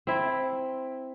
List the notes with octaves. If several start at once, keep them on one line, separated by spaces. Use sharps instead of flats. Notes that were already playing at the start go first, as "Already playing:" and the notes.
C4 E4